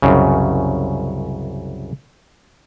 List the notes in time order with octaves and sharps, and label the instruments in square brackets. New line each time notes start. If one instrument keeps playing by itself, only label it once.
[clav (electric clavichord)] C2 F#2 C#3